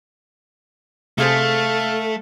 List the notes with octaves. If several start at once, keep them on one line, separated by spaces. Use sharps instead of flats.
C3 A3 G#4 A4 C5 F5 A5